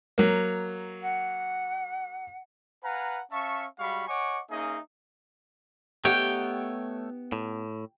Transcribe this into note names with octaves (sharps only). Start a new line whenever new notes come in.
F#3 A#3
F#5
B4 F5 F#5 G#5 A#5
C#4 E5 F5 A5 C#6
G3 G#3 F#4 F5 B5 C#6
C#5 D#5 F#5 G#5 C#6 D6
A#3 C#4 D#4 G#4 D#5 E5
A3 B3 D#4 G4 C#5 G5
A2